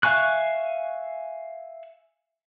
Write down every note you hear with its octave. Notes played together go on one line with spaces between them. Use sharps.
E5 F5 G#5 C#6 F#6